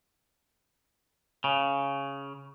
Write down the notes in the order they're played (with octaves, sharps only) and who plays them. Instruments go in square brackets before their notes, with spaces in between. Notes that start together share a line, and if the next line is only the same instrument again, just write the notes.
[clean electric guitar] C#3